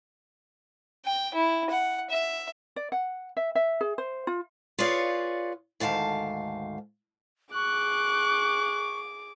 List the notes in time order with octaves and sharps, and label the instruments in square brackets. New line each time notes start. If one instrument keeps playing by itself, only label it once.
[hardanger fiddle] G5
E4
F#5
E5
[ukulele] D5
F#5
E5
E5
G#4
C5
F4
[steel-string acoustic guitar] F4 G#4 B4 C#5 D5 F5
D2 G#2 D#3 F5 A5
[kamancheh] G#4 D6 [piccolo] C#6 [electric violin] F#6